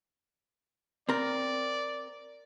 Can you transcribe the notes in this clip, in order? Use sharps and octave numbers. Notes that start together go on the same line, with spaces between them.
C4 A#4 D5